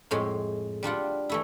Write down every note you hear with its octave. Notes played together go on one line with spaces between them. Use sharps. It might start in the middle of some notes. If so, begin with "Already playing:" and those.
F2 A2 G#3
G3 D4 F4 F#5
E3 A3 E4